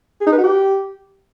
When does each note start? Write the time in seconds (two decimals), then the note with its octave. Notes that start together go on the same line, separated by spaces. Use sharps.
0.21 G#4
0.27 D#4
0.32 B4
0.38 F#4
0.44 G4